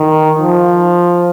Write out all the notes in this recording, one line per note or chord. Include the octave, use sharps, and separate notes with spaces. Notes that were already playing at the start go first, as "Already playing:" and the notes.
Already playing: D#3
F3